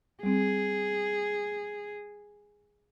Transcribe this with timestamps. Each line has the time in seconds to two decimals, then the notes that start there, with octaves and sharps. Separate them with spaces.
0.23 G3 C4 G#4